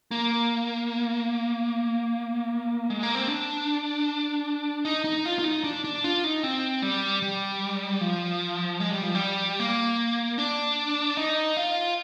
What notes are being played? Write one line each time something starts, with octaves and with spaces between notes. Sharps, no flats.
A#3
G#3
A#3
C4
D4
D#4
D#4
F4
F4
D#4
D4
D4
F4
D#4
C4
G3
G3
F3
G#3
G3
F3
G3
A#3
D4
D#4
F4